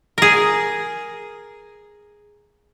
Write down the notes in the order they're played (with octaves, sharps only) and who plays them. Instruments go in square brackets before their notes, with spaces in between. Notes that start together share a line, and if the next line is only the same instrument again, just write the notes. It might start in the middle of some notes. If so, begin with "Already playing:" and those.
[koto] G#4 A#4